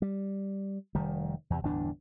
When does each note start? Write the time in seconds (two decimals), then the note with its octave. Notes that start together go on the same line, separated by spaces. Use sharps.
0.02 G3
0.95 F1 D#3 G3
1.50 E2 C3
1.63 G1 E2 A2 D4